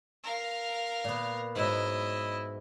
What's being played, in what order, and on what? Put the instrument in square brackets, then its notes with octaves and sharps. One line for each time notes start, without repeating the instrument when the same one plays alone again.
[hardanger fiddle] A#4 F5
[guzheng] A#2 B3
[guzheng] G#2 B2 F#3 [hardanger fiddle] E4 D#5